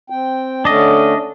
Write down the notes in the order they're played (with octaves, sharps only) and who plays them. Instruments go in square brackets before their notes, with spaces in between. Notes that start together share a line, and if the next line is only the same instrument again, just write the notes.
[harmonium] C4 G5
[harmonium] D3 A3 C#4 [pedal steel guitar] D4 D#5